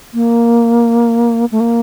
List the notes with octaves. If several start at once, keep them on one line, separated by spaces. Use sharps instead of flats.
A#3
A3
A#3